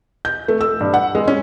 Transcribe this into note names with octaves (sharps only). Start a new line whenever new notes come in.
G6
A3
E6
G2
F#5
G#3
C#4